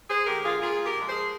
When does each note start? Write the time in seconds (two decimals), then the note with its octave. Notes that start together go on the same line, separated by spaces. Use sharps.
0.10 G#4 C5
0.26 D3 G#3 G4 A#4
0.44 F4 G#4
0.61 A#2 F4 G#4
0.84 G4 A#4
0.96 F3 G#3
1.08 G#4 C5